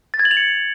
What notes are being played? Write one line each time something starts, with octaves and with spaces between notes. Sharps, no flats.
A6
G#6
F#7
F7
C#7